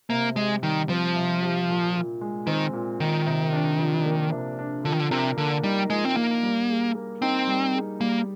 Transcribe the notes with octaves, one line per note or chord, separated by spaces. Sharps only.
C3 A#3
G#3 G4
D#3 G3
F3 C4
C3
G4
A#2
A#2
G#3
D#3 C4
A#2
A#2 D#3
C3
D4
F3
A#3
C3
D4
D3 F3
D#3
D3
C3 A#4
D3 A#3
G3 D#4
F3 G#3
C4
A#3 A#4
G3
G#4
A#3
C4 D#4
G3
G#4
G3 A#3